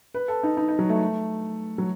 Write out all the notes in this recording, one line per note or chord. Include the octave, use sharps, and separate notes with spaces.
B4
A4
D#4
D#4
D#4
F#3
A3
F#3